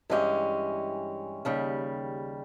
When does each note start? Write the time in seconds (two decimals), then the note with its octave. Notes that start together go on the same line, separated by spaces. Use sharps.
0.10 G2 E3 G#3 C#4 G4
1.45 D#2 C#3 G3